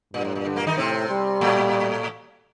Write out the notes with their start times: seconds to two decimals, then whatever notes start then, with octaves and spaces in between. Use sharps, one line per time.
0.13 G2 A#2
0.24 A2
0.35 A#2
0.45 D3
0.56 A#2 A#3
0.67 D#3 D#4
0.77 A2 C3 C4
1.10 G3
1.41 A2 A3